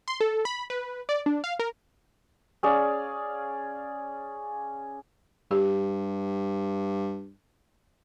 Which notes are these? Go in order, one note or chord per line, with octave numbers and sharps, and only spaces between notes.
C6
A4
B5
B4
D5
D4
F5
A#4
C#4 G#4 D5 F5
G2 G4